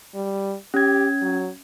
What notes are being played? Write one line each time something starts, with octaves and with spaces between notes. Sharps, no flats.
G3
C#4 G4 G#6
F#3